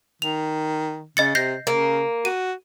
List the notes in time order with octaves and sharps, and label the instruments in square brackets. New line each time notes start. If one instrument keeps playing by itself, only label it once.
[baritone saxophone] D#3 [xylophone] F7
[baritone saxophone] C#3 [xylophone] D#5 A6 C#7
[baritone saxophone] C3 [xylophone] G6 A#6 C7
[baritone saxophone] C#3 [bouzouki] A#3
[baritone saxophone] F#4 [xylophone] D#7